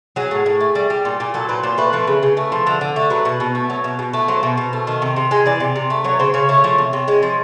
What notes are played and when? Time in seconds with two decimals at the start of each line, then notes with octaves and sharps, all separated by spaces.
0.16 F#3 G#4
0.31 A2
0.46 A2
0.60 A3
0.75 G3
0.90 G3
1.05 A#2
1.20 A#2
1.34 F#3 A4
1.49 A#2 B4
1.63 A#2 C5
1.78 A3 B4
1.93 F3 B4
2.07 C#3
2.23 C#3
2.37 A3
2.52 F3
2.67 D3
2.81 D3
2.96 A3
3.10 F#3 B4
3.25 B2
3.40 B2
3.55 A3
3.70 F#3
3.84 B2
3.99 B2
4.13 A3
4.28 F#3 C5
4.43 B2
4.58 B2
4.73 A3
4.87 D#3
5.02 C3
5.16 C3
5.31 G#3
5.46 E3 D5
5.60 C3
5.76 C3
5.90 A3
6.04 F#3 C#5
6.19 C#3 C5
6.34 C#3 C#5
6.49 A3 C#5
6.64 F3
6.78 C3
6.93 C3
7.08 G#3
7.23 F3